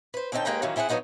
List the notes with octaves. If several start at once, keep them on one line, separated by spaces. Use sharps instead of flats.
B4 C5
D3 C4 C#4 D#4 G5 A5
D#2 G#3 A#3 B4 G5 A#5
D#3 E3 F#3 C#4 E4 F4
C4 E4 G#4 C#5 F#5
F3 F#3 B3 C4 D#4 F#4